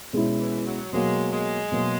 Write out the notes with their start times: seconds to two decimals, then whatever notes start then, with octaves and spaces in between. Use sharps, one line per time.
0.13 B2 G#3 C#4 E4
0.40 E3
0.66 F#3
0.92 B2 F#3 G#3 A#3
1.32 G#3
1.72 B2 F#3 A#3